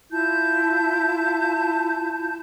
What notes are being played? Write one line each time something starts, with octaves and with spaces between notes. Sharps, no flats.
E4 F4 A5 G6